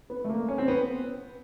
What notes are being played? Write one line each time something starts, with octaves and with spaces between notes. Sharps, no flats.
B3
A3
A#3
C#4
C4
B3